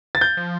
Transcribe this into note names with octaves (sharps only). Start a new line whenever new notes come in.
A6
G6
F3